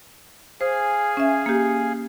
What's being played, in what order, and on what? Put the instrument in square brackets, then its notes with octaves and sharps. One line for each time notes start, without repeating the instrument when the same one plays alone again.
[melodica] G#4 F5 G#5 [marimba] C5
[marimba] C#4 E5
A#3 G4